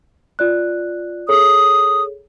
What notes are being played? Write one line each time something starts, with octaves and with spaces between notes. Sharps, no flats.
F4 D5 F#6
G#4 A4 C#5 D#6